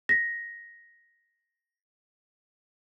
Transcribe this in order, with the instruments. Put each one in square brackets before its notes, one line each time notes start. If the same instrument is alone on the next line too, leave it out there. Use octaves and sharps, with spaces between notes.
[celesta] A#6 B6